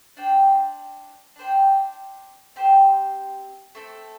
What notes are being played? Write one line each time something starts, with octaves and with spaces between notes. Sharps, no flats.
D4 C5 G5
D4 C5 G5
C4 G4 C5
A3 C4 A4